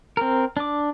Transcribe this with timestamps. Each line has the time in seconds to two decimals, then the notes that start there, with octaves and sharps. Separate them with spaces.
0.17 C4 A#4
0.57 D4 D6